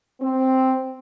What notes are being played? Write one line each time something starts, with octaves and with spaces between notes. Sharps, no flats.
C4